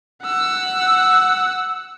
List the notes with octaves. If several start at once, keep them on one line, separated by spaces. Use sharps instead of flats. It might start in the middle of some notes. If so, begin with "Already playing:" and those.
F#5 E6